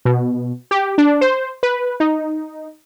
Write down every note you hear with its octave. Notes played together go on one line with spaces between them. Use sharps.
B2
G4
D4
C5
B4
D#4